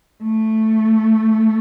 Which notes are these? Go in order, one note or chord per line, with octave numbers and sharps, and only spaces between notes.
A3